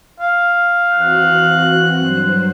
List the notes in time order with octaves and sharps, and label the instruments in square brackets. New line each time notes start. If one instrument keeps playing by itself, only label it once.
[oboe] F5
[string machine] E3 C4 F#4 [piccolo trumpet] F#6
[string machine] G2 F#3 C5